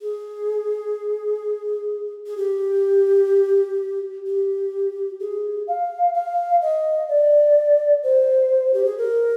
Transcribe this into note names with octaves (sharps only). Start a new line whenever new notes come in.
G#4
G#4
G4
G4
G#4
F5
F5
D#5
D5
C5
G4
G#4
A#4